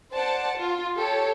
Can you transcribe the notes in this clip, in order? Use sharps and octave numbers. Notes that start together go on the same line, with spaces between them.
C5 D5 F#5 A5
F4
G4 A4 C#5